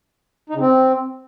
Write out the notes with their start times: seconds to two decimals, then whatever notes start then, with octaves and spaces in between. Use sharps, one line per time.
0.50 D#4
0.55 C#3
0.60 C4